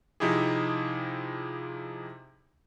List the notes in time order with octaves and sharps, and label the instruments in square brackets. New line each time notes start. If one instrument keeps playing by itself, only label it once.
[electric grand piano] C3 F3 D#4 E4 G4 G#4